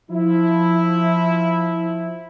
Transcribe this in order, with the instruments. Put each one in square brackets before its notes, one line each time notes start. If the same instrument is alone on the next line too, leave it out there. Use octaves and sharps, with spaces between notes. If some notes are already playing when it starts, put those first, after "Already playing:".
[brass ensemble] F3 E4